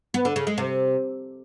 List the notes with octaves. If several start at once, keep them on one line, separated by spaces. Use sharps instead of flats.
B3
D3
C#3
G#3
C3